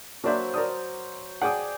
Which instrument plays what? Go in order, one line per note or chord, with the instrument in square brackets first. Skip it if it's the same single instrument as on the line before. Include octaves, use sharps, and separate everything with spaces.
[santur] F#3 C5 [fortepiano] A#3 D4 E5
[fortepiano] A#4 D5 D#6
[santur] G#4 D5 G5 [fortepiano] F#5 D#6